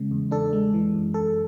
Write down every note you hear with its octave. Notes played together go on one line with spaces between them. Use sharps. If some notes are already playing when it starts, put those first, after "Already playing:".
Already playing: C#3 G#3
E2
D4 A4
G#3
E3
F#2
F#2 A4